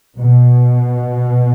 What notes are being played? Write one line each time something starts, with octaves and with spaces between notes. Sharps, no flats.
B2